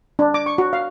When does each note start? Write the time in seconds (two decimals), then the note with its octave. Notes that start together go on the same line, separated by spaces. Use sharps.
0.19 D4
0.34 D6
0.46 C#6
0.58 F#4
0.73 F5